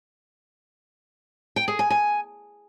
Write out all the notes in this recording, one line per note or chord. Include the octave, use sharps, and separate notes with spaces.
G5
G#4
G#5
G#5